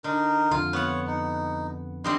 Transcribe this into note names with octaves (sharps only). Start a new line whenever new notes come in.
D3 D#4 A#4
F2 D3 F4
B3 C#5 F#5
D#4
D3 G3 C4 D#5 C6